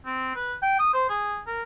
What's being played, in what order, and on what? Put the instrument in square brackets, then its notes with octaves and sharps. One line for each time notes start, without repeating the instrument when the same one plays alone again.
[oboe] C4
B4
G5
D#6
C5
G#4
A#4